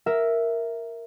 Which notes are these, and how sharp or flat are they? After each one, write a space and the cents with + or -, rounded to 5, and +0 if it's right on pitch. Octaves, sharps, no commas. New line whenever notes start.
A#4 +0 E5 +0